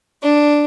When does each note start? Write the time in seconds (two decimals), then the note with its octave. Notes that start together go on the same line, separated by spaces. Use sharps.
0.22 D4